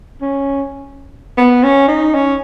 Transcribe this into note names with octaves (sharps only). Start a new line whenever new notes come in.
C#4
B3
C#4
D#4
C#4